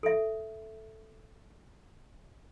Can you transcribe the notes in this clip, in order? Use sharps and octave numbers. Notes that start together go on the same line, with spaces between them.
A4 E5